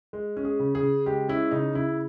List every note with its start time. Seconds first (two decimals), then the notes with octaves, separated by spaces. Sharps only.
0.13 G#3
0.37 C#4
0.45 G#4
0.60 C#3
0.75 G#4
0.83 C#3
1.06 G#3 G4
1.29 C#4 E4
1.51 C#3 D#4
1.75 C#3 E4